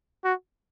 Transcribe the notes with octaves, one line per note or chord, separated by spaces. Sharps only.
F#4